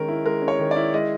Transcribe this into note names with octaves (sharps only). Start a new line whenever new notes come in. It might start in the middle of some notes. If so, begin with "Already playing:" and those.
Already playing: D#3 G#3 C#4 A#4
E4
G#3 A#4
C#4
C#5
D#3
D5
E4
G#3 D#5